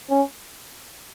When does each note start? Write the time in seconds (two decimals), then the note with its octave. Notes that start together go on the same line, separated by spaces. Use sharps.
0.10 C#4